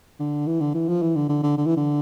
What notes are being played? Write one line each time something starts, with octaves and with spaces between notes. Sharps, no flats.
D3
E3
D3
E3
F3
E3
D3
D3
D3
D3
E3
D3